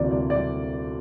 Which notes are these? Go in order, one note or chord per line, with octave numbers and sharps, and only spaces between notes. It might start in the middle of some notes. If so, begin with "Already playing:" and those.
Already playing: D2 C3 E3 A#3 D5
D5
D5